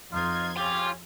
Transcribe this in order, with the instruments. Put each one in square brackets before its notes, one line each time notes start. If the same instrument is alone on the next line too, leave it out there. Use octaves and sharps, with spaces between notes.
[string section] F2 C6 G#6 [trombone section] D#4 F4
[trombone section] C#3 C#4 G4 [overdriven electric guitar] F4